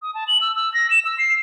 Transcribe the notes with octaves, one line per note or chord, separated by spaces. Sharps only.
D#6
A5
F#7
E6
E6
A#6
E7
E6
C7